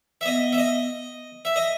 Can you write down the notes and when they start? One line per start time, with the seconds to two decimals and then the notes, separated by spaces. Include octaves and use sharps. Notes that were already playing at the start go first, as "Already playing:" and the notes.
0.21 E5
0.25 B3 D#5
0.53 E5
0.58 D#5
1.45 E5
1.56 D#5